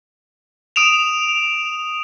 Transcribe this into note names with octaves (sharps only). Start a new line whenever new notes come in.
D#6 D7 E7 F7